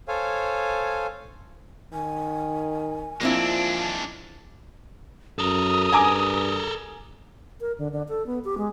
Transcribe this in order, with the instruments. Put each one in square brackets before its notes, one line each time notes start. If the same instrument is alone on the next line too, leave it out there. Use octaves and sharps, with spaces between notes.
[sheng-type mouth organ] A4 C5 C#5 F5 G#5
[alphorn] D#3 [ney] G#5
[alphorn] F3 [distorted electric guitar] G#3 D4 [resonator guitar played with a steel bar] A#3 C4 E4
[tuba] F#2 [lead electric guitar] A4 A#4 [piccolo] D#6
[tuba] G2 [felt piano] G#5 A#5 D6
[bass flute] A#4
D3
D3
A4
B3
G4
G#3